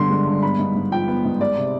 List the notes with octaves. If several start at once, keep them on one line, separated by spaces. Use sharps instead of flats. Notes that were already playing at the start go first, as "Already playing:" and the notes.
Already playing: G2 D3 G#3 B3 C6
G#3
G2
B3 B5
G#2
G#2
F3 G5
B3
G#2
G#3 D5
C3